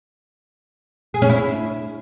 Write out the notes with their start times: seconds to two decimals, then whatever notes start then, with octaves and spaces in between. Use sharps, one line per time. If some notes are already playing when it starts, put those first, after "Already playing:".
1.14 G#4
1.22 C#4
1.29 E4